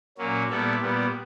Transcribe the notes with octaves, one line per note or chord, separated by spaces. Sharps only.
A#2 F#3 A#3 C#4
A#2 G3 B3 E4 A4
A#2 G3 B3